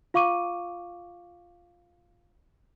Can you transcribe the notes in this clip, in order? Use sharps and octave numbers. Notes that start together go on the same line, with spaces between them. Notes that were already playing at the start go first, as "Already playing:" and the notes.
F4 F5 C#6 D6 D#7